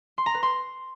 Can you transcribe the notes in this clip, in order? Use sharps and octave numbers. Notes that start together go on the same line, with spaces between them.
C6
A#5
B4
C6